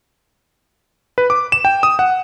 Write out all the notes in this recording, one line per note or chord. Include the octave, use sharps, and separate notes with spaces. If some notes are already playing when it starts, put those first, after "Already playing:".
B4
D6
E7
G5
D#6
F#5